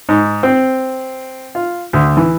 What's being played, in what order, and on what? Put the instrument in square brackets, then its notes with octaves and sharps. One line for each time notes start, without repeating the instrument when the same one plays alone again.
[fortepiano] G#2
C4
F4
D2
E3